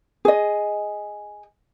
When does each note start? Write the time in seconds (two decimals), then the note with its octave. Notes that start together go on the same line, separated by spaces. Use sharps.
0.25 G#4 D#5